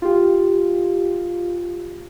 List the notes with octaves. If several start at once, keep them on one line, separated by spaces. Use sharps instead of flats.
F4 G4